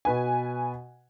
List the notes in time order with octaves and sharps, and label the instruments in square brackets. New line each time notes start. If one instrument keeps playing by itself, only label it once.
[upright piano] B2 B4 G#5